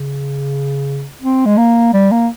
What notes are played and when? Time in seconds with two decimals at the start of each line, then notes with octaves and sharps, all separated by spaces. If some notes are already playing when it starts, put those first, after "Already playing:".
Already playing: C#3
1.21 C4
1.46 G#3
1.57 A#3
1.93 G3
2.12 A#3